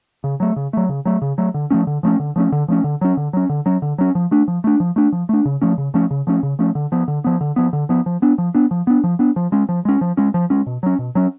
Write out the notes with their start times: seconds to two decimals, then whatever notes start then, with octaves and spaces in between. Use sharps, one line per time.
0.24 C#3
0.40 F#3 A3
0.56 C#3
0.73 F#3 A3
0.89 C#3
1.05 F#3 A3
1.22 C#3
1.38 F#3 A3
1.54 D3
1.71 F3 A3 C#4
1.87 D3
2.03 F3 A3 C#4
2.20 D3
2.36 F3 A3 C#4
2.52 D3
2.68 F3 A3 C#4
2.84 D3
3.01 F#3 C#4
3.17 D3
3.33 F#3 C#4
3.49 D3
3.66 F#3 C#4
3.82 D3
3.98 F#3 C#4
4.15 F3
4.31 A3 D4
4.48 F3
4.64 A3 D4
4.80 F3
4.96 A3 D4
5.12 F3
5.29 A3 D4
5.45 C#3
5.62 F3 A3 C#4
5.78 C#3
5.94 F3 A3 C#4
6.11 C#3
6.27 F3 A3 C#4
6.43 C#3
6.59 F3 A3 C#4
6.75 D3
6.92 F3 B3
7.08 D3
7.24 F3 B3
7.41 D3
7.56 F3 B3
7.73 D3
7.89 F3 B3
8.06 F3
8.22 B3 D4
8.38 F3
8.55 B3 D4
8.71 F3
8.87 B3 D4
9.04 F3
9.19 B3 D4
9.36 F3
9.52 G#3 C#4
9.69 F3
9.85 G#3 C#4
10.01 F3
10.17 G#3 C#4
10.34 F3
10.50 G#3 C#4
10.67 B2
10.83 F#3 C#4
10.99 B2
11.15 F#3 C#4